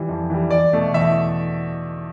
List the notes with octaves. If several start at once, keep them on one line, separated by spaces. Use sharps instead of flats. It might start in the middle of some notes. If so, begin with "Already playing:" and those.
Already playing: E3 G3
F2
E3 G3
E2 D5
B2 A3
E2 E5